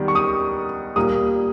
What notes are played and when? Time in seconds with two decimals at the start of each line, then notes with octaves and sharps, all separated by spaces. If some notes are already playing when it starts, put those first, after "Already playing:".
Already playing: D#3 G3 B3
0.08 C#6
0.15 D#6
0.96 A#2 G3 A#3 D#6